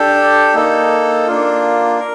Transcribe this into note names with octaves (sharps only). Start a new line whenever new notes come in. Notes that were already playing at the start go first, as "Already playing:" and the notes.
Already playing: D4 G4 A4
A#3 D#4 A4
A#3 D4 F4
A#4